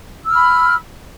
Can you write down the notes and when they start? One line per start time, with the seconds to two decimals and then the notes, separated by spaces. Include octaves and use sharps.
0.25 E6
0.29 F6
0.34 B5